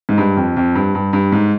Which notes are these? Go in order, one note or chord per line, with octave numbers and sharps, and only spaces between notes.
G#2
G2
F2
F2
G2
G2
G2
G#2